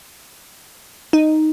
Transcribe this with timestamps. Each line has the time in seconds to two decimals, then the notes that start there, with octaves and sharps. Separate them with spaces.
1.13 D#4